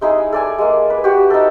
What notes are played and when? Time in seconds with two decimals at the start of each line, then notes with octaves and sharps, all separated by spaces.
0.01 G#3 D#4 E4 G#4
0.33 A4 D5 G#5
0.58 G#3 A#3
0.90 B4
1.04 F#4 G4
1.30 D#4 A4